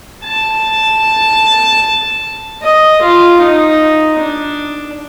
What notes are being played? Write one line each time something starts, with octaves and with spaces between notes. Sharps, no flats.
A5
D#5
F4
D#4
D4